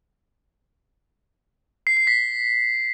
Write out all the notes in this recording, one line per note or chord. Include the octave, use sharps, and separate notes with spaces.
C7
C7
B6